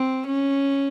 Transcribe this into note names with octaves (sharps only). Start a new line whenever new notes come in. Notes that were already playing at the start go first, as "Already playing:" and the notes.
Already playing: C4
C#4